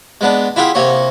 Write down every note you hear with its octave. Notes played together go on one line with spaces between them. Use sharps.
G#3 B3 D4
E4 F4 G4 G#4 F#5
C3 A#3 C#5 C#6